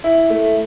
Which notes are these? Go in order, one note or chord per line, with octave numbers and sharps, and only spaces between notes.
E4
A3